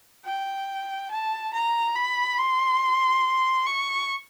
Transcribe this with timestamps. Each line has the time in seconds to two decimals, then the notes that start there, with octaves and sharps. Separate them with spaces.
0.25 G5
1.11 A5
1.53 A#5
1.96 B5
2.38 C6
3.66 C#6